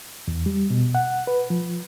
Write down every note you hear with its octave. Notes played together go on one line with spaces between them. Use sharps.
E2
G3
B2
F#5
B4
F3